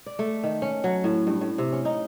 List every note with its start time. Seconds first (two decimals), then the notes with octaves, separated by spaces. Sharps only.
0.06 D5
0.19 A3
0.43 D#3
0.62 C#4
0.84 F#3
1.04 A2
1.27 G2
1.41 A2
1.58 C3
1.72 C#4
1.85 D#4